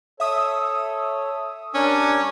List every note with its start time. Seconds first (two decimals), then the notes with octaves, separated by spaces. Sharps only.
0.20 A4 C#5 E5 D#6 E6
1.75 G3 C#4 D4 A#4 G#5